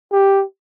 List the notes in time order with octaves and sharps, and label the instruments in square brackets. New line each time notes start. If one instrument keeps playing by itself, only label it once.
[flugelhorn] G4